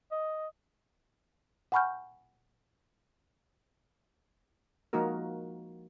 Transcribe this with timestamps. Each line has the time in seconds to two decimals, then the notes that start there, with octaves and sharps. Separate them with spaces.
0.11 D#5
1.72 F#5 G#5 B5 C#6 F6 G6
4.93 F3 G#3 A#3 D#4 F#4 A#4